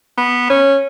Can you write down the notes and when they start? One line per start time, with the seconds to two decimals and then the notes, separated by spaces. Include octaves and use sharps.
0.18 B3
0.50 C#4